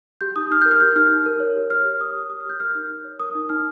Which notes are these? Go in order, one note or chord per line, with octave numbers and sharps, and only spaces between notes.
G4 G6
D#4 D#6
D#4 F6
A#4 G6
F6
G4 G6
D#4 F6
D#4
A#4
C#5
G4
C#5 F6
G4
C#5 D#6
G4
C#5 D#6
F6
G4 G6
A#4 F6
D#4
D#4
C#5
A#4 D#6
D#4
D#4 F6